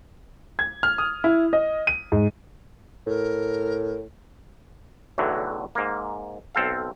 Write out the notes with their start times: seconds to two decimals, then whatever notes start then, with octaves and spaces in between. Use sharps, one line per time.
0.59 G#6
0.83 F6
0.98 D#6
1.24 E4
1.53 D#5
1.87 D#7
2.12 G#2
3.07 A2 A#4
5.18 B1 E2 A2 D3 F#3
5.75 G#2 A#3
6.55 B1 C4 A4 F5